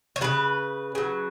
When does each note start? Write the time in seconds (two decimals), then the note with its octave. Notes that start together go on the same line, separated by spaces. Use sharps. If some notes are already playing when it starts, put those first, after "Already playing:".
0.16 C#5
0.21 C#3 F#3 B4
0.95 C#3 F#3